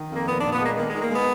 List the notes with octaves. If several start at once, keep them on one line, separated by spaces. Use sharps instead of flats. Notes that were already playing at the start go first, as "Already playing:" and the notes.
Already playing: D#3
F2 A#3
A#2 B3
A#2 D4
B3
G#3 A#3
D#3 A#3
D#3 G#3
A#3
G#3 B3